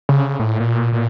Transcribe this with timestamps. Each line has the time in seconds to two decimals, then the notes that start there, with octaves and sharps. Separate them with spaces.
0.09 C#3
0.39 A2
0.60 A#2
0.93 A#2